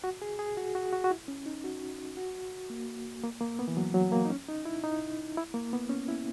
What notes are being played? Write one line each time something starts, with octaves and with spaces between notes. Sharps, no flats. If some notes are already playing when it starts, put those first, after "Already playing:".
F#4
G#4
G#4
F#4
F#4
F#4
F#4
E4
C#4
D#4
F#4
F#4
A#3
A#3
A#3
B3
E3
F#3
F#3
A#3
D#4
C#4
D#4
E4
D#4
E4
A#3
B3
C#4
E4